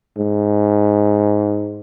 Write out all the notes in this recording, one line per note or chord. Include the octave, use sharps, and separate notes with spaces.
G#2